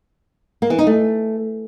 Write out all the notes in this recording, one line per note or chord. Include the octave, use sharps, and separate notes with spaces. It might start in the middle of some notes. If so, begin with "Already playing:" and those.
A#3
E3
D#4
A3